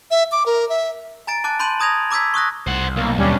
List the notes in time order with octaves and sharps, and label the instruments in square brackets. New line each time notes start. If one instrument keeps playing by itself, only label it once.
[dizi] E5
D6
A#4
E5
[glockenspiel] G#5 A#5 A6 D7
A5 D6 F#6 A6
A5 B5 C6 G6 D#7 F#7
A#5 D#6 G#6 A#6 F7
A#5 D6 E6 G#6 B6
C#6 D#6 F#6 A#6
[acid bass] C2 [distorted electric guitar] C5 F#5
[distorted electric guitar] B1 [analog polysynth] A#3
[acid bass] D#2 [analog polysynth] G3 C#4 D4